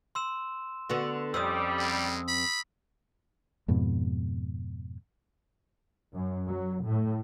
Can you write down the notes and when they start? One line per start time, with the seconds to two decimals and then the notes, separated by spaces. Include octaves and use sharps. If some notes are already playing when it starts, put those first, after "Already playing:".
0.15 C6 E6 E7
0.89 D3 B3 F#4
1.34 F2 G3 C4 C#4 D#6 E6
1.79 G#3
2.28 B5
3.68 F2 G#2 B2
6.13 F#2
6.47 F#3
6.84 A2